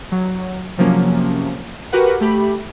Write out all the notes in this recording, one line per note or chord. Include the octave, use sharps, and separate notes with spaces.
F#3
C3 F3 F#3 A#3 C#4
F#4 G4 A#4 B4 F#5
A3 G4 B5